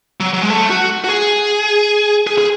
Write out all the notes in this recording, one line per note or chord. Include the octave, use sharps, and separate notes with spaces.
F#3
F#3
G#3
A3
F#4
F#4
G#4
G#4
G#4